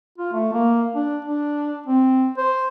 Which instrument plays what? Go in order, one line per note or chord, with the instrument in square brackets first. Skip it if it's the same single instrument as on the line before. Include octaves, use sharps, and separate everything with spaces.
[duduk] F4
A3
A#3
D4
D4
C4
C5